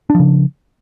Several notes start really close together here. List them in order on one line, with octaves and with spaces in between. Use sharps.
D4 F3 C#3